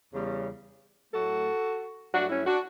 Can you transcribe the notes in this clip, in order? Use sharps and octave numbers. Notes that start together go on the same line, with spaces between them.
E2 C#3 G3
A2 F#3 A3 F#4 A4
G2 F#3 A3 D4 F#4
C#4 E4
D4 F#4